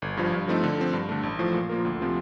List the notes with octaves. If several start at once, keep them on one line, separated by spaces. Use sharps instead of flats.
G1
G2 F3
G2
F3 A3 C4 D#4
D3
F3 C4
G2
D3 A3
A1
A2 F3
A#2
F3 A#3 F4 A#4
D2
C3 F3 C4 F4